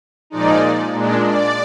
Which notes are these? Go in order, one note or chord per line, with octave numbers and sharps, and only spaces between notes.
A#2 F3 G#3 D#4 D5
A#2 G#3 D4
D5